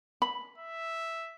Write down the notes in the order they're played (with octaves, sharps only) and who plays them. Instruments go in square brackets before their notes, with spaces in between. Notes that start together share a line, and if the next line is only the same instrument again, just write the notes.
[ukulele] B5
[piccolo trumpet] E5